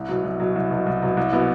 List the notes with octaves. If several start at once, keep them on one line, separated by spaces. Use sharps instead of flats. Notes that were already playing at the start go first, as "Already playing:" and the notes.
Already playing: C2
B2 F#3
C2
B2 F#3
C2
B2 F#3
C2
B2 F#3
C2
B2 F#3 B3 E4